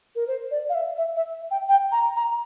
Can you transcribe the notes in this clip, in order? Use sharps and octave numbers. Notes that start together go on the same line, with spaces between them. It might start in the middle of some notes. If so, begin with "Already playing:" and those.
A#4
C5
D5
F5
E5
E5
E5
G5
G5
A#5
A#5